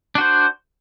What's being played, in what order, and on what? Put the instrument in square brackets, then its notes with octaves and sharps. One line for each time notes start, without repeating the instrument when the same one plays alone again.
[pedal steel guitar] D4
F#4
C5